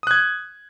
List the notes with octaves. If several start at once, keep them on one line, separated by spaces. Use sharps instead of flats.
D#6 F#6 G#6